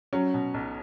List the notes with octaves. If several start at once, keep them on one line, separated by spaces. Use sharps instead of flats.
F#3 C#4
B2
B1